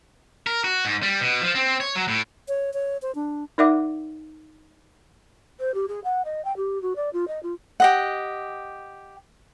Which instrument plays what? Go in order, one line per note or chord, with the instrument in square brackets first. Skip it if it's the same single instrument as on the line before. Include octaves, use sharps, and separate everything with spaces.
[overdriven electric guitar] A#4
F#4
G#2
G3
B2
F3
C4
C#5
F#3
A2
[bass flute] C#5
C#5
C5
D4
[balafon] D#4 A#4 D5 E5 F#5 D6
[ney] C5
G4
G#4
F#5
D#5
G5
G4
F#4
D5
F4
D#5
F4
[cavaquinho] G4 D#5 F#5